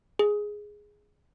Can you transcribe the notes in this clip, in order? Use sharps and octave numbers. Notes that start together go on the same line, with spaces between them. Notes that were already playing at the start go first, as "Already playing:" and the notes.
G#4